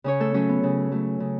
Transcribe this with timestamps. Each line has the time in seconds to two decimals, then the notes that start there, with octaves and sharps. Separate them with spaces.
0.04 C#3 C#4 C#5
0.20 A3 A4
0.34 F#3 A3 C#4
0.49 B3
0.63 C#3
0.92 F#3 A3
1.20 C#3